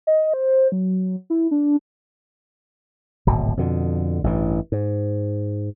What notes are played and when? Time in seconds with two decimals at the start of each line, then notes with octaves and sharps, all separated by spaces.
0.07 D#5
0.34 C5
0.72 F#3
1.30 E4
1.51 D4
3.27 D1 G#1 B2
3.57 F2 B2 D3
4.24 A1 G2 E3
4.72 G#2